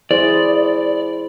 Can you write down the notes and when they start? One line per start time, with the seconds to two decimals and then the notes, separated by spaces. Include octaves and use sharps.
0.11 E4 G#4 C5 D5